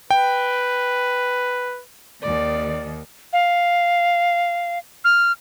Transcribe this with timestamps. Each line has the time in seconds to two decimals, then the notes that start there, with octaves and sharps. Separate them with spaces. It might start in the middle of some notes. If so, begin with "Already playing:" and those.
0.11 B4 G5
2.22 D#2 D#3 D5
3.33 F5
5.05 F6